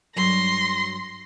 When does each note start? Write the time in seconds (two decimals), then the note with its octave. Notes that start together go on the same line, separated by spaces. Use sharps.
0.16 G2 F#3 C6 A#6